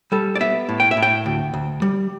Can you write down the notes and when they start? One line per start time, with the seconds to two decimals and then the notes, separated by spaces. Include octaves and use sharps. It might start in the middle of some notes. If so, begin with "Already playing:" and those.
0.12 G3 A4
0.35 D5
0.40 B3 E5
0.69 A2
0.80 G5
0.91 E5
0.97 A2
1.02 G5
1.26 D2
1.54 D2
1.82 G3